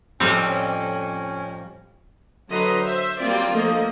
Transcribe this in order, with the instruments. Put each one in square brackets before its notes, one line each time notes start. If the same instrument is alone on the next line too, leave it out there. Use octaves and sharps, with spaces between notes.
[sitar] F2 [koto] A2 G3 C4 [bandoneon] C#4
[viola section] D3 F#3 B4 D#5 A#5 C6
C5 E5
F#3 G3 A#3 C4 F4 D5
D3 F3 A3 A#3 D#5